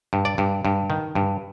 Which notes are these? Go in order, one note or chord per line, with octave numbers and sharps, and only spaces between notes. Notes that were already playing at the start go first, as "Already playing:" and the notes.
G2
D5
G2
G2
D#3
G2